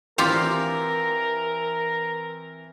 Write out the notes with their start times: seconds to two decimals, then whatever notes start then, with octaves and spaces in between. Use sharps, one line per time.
0.18 E3 C4 F4 G4 A#4 F5